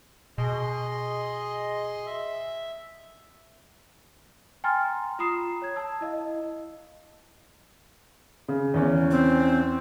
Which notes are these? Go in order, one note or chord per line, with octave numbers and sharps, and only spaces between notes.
B2 G#4 D#5 C6
E5
G5 G#5 A#5 C6 F6 A6
F4 A#5 B5 D#6 C7 E7
C#5 G#6
A5 E6
E4 D#5 F5
C#3
E2 C#4
C4